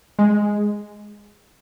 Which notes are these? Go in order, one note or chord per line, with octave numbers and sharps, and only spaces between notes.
G#3